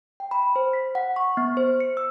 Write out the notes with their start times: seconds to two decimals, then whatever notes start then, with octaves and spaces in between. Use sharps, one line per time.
0.20 G5
0.31 B5
0.56 C5
0.73 B6
0.95 F#5
1.16 C#6
1.37 B3
1.57 C5
1.80 C#7
1.97 E6